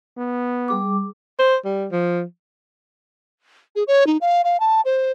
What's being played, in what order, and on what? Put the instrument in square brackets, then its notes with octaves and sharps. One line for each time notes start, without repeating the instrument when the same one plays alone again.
[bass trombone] B3
[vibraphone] G3 G#4 D6
[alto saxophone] C5
G3
F3
[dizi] G#4
C#5
D#4
F5
F5
A5
C5